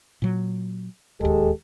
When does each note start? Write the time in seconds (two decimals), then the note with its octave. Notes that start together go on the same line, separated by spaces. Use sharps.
0.22 A#2 F#3
1.21 D1 D#2 G#3 G4 A4